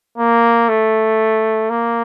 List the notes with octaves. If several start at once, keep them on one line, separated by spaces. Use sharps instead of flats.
A#3
A3
A#3